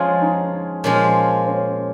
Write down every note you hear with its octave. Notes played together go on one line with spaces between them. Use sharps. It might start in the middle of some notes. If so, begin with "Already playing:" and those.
Already playing: F3 G#3 C#4 F4 G#4
D#4
A#2 F3 G#3 C#4
C#4